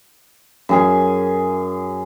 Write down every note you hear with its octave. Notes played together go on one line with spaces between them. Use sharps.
F#2 G#4 G#5